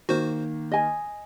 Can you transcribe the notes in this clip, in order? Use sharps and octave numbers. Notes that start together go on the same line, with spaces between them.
D#3 A#3 F#4 C5
D#5 G#5